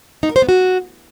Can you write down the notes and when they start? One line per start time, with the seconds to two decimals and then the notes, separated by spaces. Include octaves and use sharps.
0.23 D#4
0.29 A#4
0.36 C5
0.42 B3
0.49 F#4